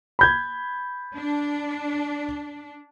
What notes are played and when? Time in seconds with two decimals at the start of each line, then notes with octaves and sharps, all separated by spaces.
0.19 B5 G6 G#6
1.18 D4